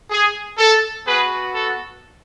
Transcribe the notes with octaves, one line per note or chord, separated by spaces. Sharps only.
G#4
A4
B3 F#4 G#4 B4
A4